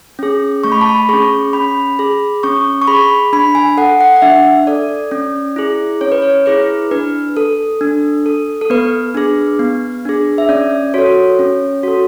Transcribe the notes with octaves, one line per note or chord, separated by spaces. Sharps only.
C#4 G#4
A3 C#6
B5
A5
B5
C#4 G#4 C#6
C#4 B5
G#4
C#4 C#6
C#6
G#4 B5
D4 B5
G#5
A4 F#5
F#5
F#5
D4 E5
A4 D5
C#4
E4 G#4
C#4 C#5
B4
C#5
E4 G#4 B4
D4 B4
A4
D4
A4
A4
B3 B4
D4 G#4
B3
D4 G#4
E5
C#4 D5
F#4 A4 C#5
C#4
F#4 A4